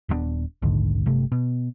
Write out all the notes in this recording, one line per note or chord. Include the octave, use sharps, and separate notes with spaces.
D#1 G2 B3 D4
A#1 D#2 G#2 D3
G1 C3 A3
B2